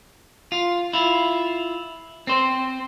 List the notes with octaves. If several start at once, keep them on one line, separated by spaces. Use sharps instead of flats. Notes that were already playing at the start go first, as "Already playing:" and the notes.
F4
E4 F4
C4 C5